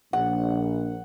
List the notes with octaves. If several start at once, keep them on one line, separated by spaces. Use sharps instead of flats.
A#1 F#5